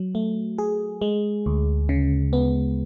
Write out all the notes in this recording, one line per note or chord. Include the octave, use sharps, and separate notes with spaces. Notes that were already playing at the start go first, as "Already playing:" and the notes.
Already playing: F#3
A3
G#4
G#3
D2
C#3
B3